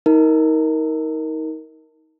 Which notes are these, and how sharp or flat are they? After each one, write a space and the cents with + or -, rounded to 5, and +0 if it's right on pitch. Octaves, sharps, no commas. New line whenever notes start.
D#4 +30 A#4 +0